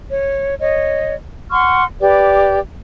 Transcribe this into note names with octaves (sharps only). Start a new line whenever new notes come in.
C#5
C#5 D#5
F#5 C6 C#6 F6
G4 B4 D5